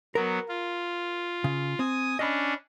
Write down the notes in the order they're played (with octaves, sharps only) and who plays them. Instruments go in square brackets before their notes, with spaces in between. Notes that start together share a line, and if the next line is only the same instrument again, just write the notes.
[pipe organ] F#3 B3 [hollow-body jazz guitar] A#4
[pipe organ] F4
[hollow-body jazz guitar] C#3
[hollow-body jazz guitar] C4 [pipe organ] G#5 D#6
[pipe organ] C#4 D4 [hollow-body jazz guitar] D#5 B5